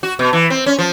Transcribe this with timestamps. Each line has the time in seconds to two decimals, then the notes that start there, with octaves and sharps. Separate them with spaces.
0.03 F#4
0.19 B2
0.33 E3
0.50 C4
0.66 C#4
0.79 F3